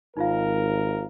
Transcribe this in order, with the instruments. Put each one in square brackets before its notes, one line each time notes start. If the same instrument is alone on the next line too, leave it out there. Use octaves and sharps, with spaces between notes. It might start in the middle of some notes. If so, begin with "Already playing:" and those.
[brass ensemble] G#1 A#4 [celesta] D#4 F4 F5